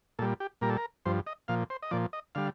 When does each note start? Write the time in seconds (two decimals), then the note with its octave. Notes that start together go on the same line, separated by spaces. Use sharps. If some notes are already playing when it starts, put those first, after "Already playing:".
0.19 A#2 A4
0.22 G3
0.40 G4
0.61 A#2 G3 A#4
0.69 A4
0.77 A#4
1.05 G2 F3 C5
1.27 D#5
1.48 A#2 F3 F5
1.70 C5
1.83 D#5
1.91 A#2 F3 D5
2.13 D#5
2.35 D3 G3 F5